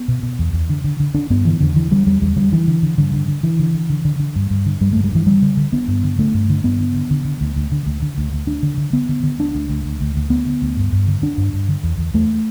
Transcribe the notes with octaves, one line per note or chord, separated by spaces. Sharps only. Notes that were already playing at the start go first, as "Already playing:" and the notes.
Already playing: B3
B2
B2
E2
E2
D3
D3
D3
D3 D4
G2 B3
D3 E3
E2 D3
D3 E3
D3 G3
E2 G3
E2 G3
D3 G3
D3 E3
D3
D3
G2 D3
D3
D3
D3 E3
D3
D3
D3
D3
D3
G2
G2
D3
G2 G3
G2 A3
G3
G2 E3
D3 G3
D3
D3
D3 B3
G2
D3
D3 A3
G2
D3
G2 B3
D3
D3
D3
D3
D2
D2
D3
D2
D3
D2
D2
D2 D4
D3
D3
D3 B3
D3
D3
D2 D4
D2
D2
D2
D2
D2
D2 B3
D3
D2
G2
G2
D3
D3 D4
G2
G2
D3
E2
E2
E2 A3